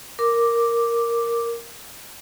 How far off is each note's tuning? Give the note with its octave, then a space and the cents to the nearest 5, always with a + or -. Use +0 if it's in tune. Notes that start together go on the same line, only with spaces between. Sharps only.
A#4 +0 D6 +0